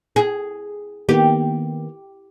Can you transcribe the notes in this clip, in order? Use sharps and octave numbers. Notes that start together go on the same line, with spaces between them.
G#4
D#3 A#3 B3 G4